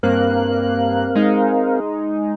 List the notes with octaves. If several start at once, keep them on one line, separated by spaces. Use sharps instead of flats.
G2 A#3 C4 A#4 F5 F#6
G#3 D#4